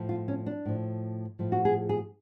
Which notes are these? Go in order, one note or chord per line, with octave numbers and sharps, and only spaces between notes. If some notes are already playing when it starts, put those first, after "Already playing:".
Already playing: A2 F3
F4
C#4
D4
A2 F3
A2 F3
F#4
G#4
G#4